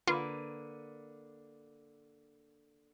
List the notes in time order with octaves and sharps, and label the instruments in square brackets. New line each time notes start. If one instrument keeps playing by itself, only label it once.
[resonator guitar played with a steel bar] D3 A#3 B4 [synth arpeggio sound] F4